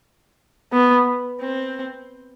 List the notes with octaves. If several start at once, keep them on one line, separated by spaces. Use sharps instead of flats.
B3
C4